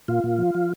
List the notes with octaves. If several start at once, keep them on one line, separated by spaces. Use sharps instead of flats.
A#2 F4
A#2
F3
F3